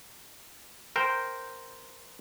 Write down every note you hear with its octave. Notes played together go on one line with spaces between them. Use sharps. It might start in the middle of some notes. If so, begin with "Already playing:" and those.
A#4 C5 G5